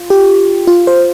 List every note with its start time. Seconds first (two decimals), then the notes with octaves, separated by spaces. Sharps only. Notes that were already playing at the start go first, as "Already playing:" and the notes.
Already playing: F4
0.10 G4
0.67 F4
0.87 C5